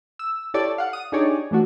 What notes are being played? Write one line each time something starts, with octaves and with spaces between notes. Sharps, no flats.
E6
E4 G4 A4 C#5 D5
F5 F#5
D#6
D4 D#4 G4 G#4 C#5 D5
E3 A3 D4 F#4